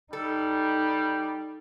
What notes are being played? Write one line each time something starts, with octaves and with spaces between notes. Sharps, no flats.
G3 D#4 A4